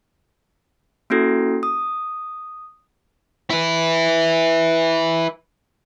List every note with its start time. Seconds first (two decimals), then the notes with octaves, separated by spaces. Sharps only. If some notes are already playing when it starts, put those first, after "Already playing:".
1.10 A#3 C#4 E4 F#4 A4
1.63 D#6
3.50 E4 B4